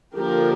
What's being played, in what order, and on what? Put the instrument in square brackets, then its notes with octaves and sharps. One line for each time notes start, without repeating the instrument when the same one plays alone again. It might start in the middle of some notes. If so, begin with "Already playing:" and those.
[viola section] D3 F3 A#3 G4 A#4